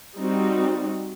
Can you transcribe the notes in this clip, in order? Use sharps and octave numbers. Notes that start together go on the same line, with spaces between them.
G3 C4 D#4 F#4